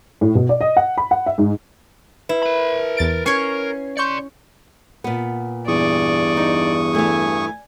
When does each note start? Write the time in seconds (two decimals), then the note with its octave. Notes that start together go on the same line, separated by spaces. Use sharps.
0.21 A2
0.35 B2
0.49 D5
0.61 D#5
0.77 F#5
0.98 B5
1.11 F#5
1.26 E5
1.38 G#2
2.29 E4 B4
2.43 A#4 B5
2.97 E2 A6 D7
3.26 C#4 A#4 C#5 C#6 G#6 C7
3.97 D5 C6 C#6 G6 C#7
5.04 A#2 B3
5.68 E2 G2 D5 C#6 D#6
6.37 D#4
6.95 E3 A3 G#5